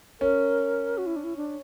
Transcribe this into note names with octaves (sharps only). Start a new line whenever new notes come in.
C#4 A#4
F#4
E4
D4
E4
D4